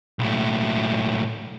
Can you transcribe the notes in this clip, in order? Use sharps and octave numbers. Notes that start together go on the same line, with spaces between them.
B1 A2